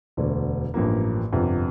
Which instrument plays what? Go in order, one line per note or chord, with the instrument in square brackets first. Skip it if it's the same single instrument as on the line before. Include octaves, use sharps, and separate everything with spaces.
[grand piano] E1 D2 D3
A1 G2 F3 A#3
G1 F2 C3